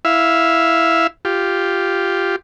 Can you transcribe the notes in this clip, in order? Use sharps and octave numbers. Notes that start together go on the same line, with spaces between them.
E4 E5 F5
F4 G4